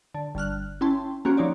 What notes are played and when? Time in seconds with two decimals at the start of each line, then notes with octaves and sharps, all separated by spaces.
0.14 D3
0.35 G1 D3 F6 F#6
0.81 C#4 E4 G5 A5 C6
1.25 A#3 C4 C#4 F#4 G4
1.37 F3 C#4 D#4 C#5 D5